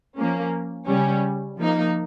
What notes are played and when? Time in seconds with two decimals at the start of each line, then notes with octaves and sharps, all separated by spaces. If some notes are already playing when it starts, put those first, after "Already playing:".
0.17 F3 A#3 C#4
0.87 C#3 G3 C#4
1.57 F3 A#3 D#4